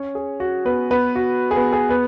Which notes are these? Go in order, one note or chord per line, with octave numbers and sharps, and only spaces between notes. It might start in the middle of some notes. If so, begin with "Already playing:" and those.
Already playing: C#4 C#5
G#4
F#4
B3 B4
B3 B4
F#4
G#4
B3 B4
G#4
B3 B4